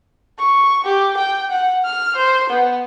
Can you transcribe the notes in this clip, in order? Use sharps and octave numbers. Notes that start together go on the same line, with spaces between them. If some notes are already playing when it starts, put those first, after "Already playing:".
C#6
G4
G5
F#5
F6
C5
B3